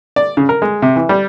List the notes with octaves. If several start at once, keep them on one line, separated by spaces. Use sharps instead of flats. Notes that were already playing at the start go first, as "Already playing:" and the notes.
D5
C#3
A#4
G#3
C3
E3
G3